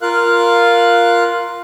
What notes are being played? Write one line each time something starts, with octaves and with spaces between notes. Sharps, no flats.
F4 A#4 F5 F#6